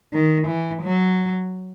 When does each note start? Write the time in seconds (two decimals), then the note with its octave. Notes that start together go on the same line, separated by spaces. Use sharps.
0.13 D#3
0.47 E3
0.82 F#3